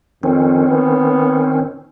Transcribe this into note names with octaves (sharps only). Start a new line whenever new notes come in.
F2 D#3 C4 C#4
B3